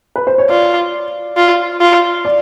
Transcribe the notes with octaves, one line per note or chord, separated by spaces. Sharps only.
B4
C5
C#5
F4 D5
F4
F4
D5